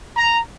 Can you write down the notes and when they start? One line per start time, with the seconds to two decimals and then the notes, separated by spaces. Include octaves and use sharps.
0.16 A#5